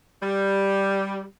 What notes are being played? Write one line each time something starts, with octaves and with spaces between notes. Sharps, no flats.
G3